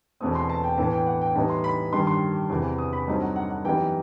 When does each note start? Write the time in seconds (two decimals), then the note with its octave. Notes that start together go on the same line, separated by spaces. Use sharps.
0.20 E2 B2 A3 C4 D#6
0.35 C6
0.49 A5
0.64 G5
0.78 A2 E3 B3 A5
0.93 G5
1.06 F#5
1.21 G5
1.35 A2 E3 G3 B3 D#4 A5
1.49 C6
1.64 B5
1.93 G2 D#3 G3 C6
2.07 C6
2.50 E2 C3 E3
2.78 D#6
2.93 B5
3.07 G2 F#3 A3 C4 D#4
3.22 F#5
3.36 F#5
3.50 F#5
3.65 F#2 E3 G3 B3 D#4 G5